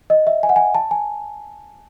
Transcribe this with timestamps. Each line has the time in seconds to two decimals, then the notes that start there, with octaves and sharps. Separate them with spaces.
0.10 D#5
0.27 E5
0.43 G#5
0.49 F#5
0.56 G#5
0.75 A5
0.91 G#5